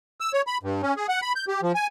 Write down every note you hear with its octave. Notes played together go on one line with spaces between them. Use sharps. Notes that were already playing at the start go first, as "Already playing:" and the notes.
E6
C#5
B5
G2
C#4
G#4
F#5
B5
G6
G4
F3
G#5